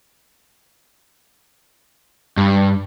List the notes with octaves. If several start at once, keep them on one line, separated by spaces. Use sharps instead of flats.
G2